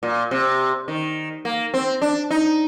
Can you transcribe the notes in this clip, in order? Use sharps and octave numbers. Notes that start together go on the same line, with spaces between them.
A#2
C3
D#3
A#3
C4
D4
D#4